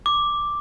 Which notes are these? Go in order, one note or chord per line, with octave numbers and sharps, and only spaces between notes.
D6